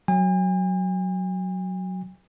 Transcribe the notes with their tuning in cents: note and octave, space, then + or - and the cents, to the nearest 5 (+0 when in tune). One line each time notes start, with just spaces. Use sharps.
F#3 +0 G#5 -45